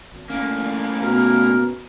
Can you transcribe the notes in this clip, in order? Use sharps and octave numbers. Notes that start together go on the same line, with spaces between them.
G#1
A2 A#3 C#4
B2 A#4